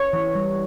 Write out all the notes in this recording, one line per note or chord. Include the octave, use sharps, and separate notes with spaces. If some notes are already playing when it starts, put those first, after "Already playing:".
Already playing: C#5
E3
G3